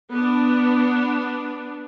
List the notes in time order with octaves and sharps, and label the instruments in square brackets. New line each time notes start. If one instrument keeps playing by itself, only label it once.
[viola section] B3 D4